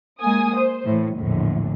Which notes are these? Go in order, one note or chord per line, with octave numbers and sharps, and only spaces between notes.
G#3 A#3 G#5 D#6
C5
A2 E3
A#1 E2 A2 D3